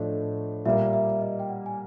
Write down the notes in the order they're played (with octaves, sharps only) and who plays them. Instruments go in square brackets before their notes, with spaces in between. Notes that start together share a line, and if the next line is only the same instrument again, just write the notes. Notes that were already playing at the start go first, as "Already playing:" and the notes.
Already playing: [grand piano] A2 F3 A3 D4 [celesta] D#5
[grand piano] A#2 G3 A#3 [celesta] E5
[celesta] E5
D#5
G5
F#5
G#5